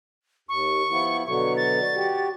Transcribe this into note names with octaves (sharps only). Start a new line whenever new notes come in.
D#2 C#6
F3 B3 E4
B2 D3 F#3 C#6
A6
F#4 G4